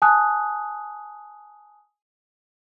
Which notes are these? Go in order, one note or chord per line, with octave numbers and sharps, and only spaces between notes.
G#5 A5 D#6 F#6